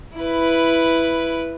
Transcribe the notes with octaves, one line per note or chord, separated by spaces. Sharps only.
E4 B4